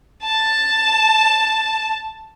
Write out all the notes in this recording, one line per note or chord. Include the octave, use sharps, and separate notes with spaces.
A5